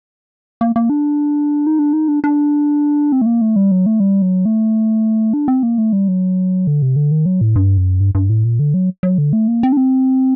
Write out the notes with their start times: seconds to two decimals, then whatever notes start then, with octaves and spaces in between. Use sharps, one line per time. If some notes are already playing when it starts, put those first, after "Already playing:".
0.61 A#3
0.76 A#3
0.90 D4
1.67 D#4
1.79 D4
1.93 D#4
2.08 D4
2.24 D4
3.12 C4
3.22 A3
3.26 A#3
3.41 A3
3.56 G3
3.72 F#3
3.86 A3
4.00 G3
4.22 F#3
4.46 A3
5.33 D4
5.48 C4
5.63 A#3
5.78 A3
5.93 G3
6.08 F#3
6.67 D3
6.82 C3
6.96 D3
7.11 D#3
7.26 F#3
7.41 A2
7.56 G2
7.78 F#2
8.01 G2
8.15 G2
8.30 A2
8.44 A#2
8.59 D3
8.74 F#3
9.03 F#3
9.18 D3
9.33 A3
9.48 A#3
9.63 C4
9.72 D4
9.77 C4